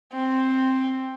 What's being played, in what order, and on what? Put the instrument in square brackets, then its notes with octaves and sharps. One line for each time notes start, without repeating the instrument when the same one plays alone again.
[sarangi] C4